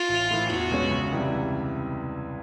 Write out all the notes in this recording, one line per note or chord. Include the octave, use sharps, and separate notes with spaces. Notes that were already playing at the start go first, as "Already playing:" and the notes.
Already playing: F4
A1
A2 E3
E2 F#4
B2 G#3 C#4
C#2
C3 E3 G3